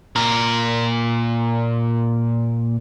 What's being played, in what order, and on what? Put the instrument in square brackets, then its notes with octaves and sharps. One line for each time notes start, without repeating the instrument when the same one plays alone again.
[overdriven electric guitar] A#2 A#4